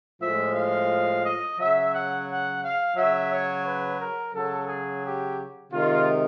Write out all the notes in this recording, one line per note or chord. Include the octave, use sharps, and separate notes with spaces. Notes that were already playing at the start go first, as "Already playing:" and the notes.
A2 F3 G#3 E5
F5
D#5
C#3 F#3 E5
F#5
F#5
F5
C#3 F#3 E5
C#5
B4
A#4
C#3 F#3 A4
G#4
G4
C3 D#3 G#3 F4